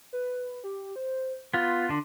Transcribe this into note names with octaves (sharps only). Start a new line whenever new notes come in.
B4
G4
C5
B3 F4 C6
D3 D4